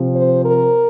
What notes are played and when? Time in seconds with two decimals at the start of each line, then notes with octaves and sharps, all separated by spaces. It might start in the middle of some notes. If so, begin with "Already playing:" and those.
Already playing: C3 F3 C4
0.14 C5
0.44 A#4